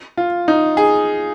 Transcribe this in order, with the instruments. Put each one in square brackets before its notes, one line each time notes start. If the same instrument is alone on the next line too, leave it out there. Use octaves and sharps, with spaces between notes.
[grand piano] F4
D#4
G#4